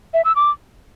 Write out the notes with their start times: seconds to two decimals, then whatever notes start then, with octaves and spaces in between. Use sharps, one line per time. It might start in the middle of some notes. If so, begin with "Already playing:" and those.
0.14 E5
0.25 E6
0.36 D6